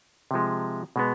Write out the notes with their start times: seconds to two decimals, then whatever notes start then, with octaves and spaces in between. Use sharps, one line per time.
0.31 C3 F3 G#3
0.96 B2 G#3 B3